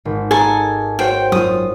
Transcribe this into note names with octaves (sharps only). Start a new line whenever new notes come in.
G#1
G#4 A4 G#5 A#5
F#4 C5 C#5 G5
F#2 F4 D#6